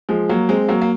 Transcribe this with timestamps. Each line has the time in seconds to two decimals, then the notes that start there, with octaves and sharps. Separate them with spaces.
0.09 F3 G#3
0.29 F#3 A#3
0.49 G#3 C4
0.68 F#3 A#3
0.81 A#3